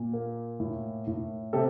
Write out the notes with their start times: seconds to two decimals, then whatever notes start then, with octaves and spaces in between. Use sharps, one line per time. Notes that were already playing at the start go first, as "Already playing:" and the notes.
Already playing: A#2
0.13 A#3
0.60 A2
1.07 A2
1.53 C3 G4 A4